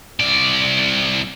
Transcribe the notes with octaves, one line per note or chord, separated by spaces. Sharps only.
C2 D5